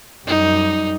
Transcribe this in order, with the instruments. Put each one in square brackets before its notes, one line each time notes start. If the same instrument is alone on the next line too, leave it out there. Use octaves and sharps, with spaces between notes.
[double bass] F#2 G3 [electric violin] D#4